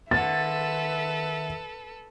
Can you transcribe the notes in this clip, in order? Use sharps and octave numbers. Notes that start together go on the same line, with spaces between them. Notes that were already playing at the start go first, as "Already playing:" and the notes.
D#3 A4 B4 E5 F#5 A6